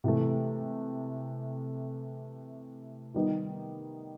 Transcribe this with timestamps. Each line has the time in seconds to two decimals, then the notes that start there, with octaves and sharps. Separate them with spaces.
0.04 C3 E3 A3
3.14 D#3 G3 B3 D#4